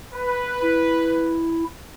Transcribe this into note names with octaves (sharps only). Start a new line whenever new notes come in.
B4
E4